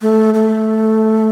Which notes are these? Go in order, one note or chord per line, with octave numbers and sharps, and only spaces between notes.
A3
A3